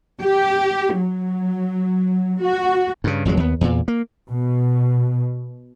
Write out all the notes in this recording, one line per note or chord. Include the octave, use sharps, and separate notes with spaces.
G4
F#3
F#4
G2 C#3
G#1 F2 F#3 G#3
D#2 B3
E2 A#2
A#3
B2